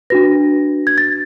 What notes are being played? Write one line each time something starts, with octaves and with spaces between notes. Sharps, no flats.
D4 F#4 B4 A#6
G#6
A6